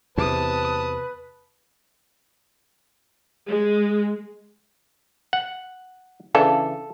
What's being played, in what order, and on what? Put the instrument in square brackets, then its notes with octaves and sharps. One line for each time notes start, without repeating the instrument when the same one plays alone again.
[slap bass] E2 C3 [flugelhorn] B4 [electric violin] A5 D#6
[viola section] G#3
[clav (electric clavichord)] F#5
[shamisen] C#3 E3 D4 [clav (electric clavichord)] A4